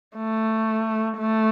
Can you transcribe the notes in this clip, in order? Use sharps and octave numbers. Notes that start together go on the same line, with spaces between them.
A3
A3